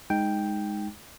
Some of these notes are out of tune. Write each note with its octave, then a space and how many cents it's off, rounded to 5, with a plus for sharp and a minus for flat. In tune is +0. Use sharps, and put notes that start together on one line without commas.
G#3 +0 D#4 +0 G5 +0